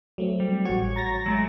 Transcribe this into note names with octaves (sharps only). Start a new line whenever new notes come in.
F#3 A3 C4
G3
A1 F#4 C#5
A#5 A6 A#6
F#3 G#3 A3